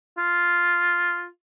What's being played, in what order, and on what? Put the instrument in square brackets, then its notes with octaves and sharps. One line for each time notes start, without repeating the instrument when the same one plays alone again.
[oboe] F4